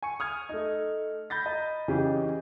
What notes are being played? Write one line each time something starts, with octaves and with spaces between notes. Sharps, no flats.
G#5 C#6 C#7
D#6 F6 G#6
A3 D#4
B5 G6 A6 A#6
D#5 A#5 B5
C#3 E3 C#4 D#4 G4 G#4